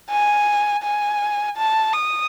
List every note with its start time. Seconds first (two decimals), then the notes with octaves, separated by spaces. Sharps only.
0.10 G#5
0.83 G#5
1.57 A5
1.93 D#6